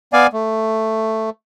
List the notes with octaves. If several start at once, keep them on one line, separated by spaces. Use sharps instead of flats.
B3 D5 F5 G#5
A3